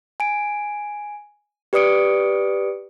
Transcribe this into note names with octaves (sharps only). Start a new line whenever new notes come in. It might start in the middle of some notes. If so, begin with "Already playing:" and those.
G#5 D7
G4 B4 D5 D#6 C#7 D7